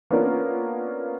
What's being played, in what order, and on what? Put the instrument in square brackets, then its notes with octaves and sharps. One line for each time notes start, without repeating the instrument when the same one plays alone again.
[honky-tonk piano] A#3 B3 C#4 D4 F4 A#4